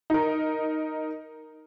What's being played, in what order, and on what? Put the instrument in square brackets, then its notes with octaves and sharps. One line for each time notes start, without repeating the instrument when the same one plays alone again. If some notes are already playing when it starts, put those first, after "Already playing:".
[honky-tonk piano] D#4 A#4